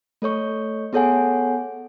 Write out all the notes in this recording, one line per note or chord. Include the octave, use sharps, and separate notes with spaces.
A3 A4 C#5 C#6
B3 G#4 A4 C#5 F#5 G#5